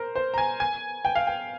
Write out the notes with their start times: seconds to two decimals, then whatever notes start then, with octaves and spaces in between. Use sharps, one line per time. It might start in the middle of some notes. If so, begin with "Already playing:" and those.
Already playing: A#4 C5
0.15 C5
0.34 A#5
0.38 G#5
0.60 G#5
1.05 G5
1.15 F5
1.27 G5